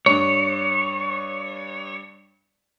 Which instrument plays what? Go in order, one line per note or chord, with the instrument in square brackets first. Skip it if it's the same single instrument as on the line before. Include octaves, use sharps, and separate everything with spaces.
[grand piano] G2 [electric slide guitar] C#5